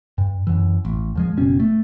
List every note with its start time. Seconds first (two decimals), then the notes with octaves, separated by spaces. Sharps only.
0.18 G2
0.47 F#2 E3
0.85 A1
1.15 D#2 F3 G#3
1.37 F#1 B2 C#4
1.60 A3